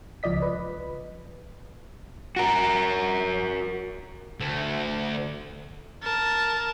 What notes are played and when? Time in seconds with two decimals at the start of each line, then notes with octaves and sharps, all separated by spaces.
0.23 C#2 F3 D5 D#5 B6
0.42 B4
2.36 F#4 A#4
4.40 D2 A3
6.03 A#4 A5